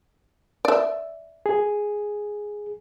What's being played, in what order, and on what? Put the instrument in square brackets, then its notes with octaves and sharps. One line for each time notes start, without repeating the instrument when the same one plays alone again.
[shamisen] D5 E5
[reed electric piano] G#4